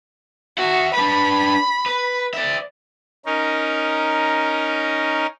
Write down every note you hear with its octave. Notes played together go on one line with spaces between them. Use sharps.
F#4 E5 F#5
D4 B4 B5
B4
D5 E5
C#4 D#4 A#4